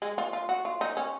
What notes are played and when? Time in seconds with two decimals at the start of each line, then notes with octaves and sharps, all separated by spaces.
0.02 G#3
0.18 F4
0.33 F4
0.49 F#4
0.65 F4
0.81 D#4
0.97 C#4